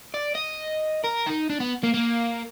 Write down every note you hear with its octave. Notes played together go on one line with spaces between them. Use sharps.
D5
D#5
A#4
D#4
D4
B3
A#3
A#3